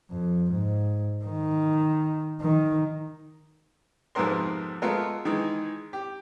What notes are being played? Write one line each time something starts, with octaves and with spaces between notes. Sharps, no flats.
F2
G#2
D#3
D#3
F2 G#2 C3 B3 A#4 C6
G#3 A3 B3 F4 A#4
D#3 E3 G#3
G4